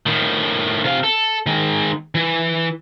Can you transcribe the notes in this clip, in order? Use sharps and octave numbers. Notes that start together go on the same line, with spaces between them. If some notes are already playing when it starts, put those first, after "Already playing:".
A2 D#3
C3 F5
A4
D#3 G#3
E3